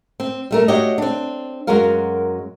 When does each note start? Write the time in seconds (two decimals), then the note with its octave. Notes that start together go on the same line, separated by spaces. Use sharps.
0.20 C4
0.51 G3 A3 A#4
0.68 D4 F#4 G4 C#5 D#5
0.98 C4 D4
1.67 F#2 F#3 G#3 F#4 A#4 F5